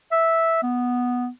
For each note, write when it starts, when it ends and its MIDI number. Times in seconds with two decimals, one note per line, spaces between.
0.12 0.63 76
0.63 1.28 59